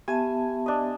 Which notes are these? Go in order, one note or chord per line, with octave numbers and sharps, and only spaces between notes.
B3 G4 E5 G#5 A5
D4 D#5